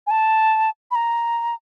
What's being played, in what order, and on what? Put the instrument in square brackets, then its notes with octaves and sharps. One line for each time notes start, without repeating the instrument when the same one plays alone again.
[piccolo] G#5
A5
B5
A#5